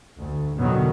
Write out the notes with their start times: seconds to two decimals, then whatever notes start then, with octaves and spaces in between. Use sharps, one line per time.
0.18 D2
0.56 E2 B2 D3 D#3 F#3 B3